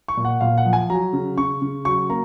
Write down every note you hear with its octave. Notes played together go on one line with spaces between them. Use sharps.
C#6
A#2
F#5
A#2 F5
F#5
F3
G#5
F#3 A#5
C#3
C#3 C#6
C#3
F#3 C#6
A#3 A#5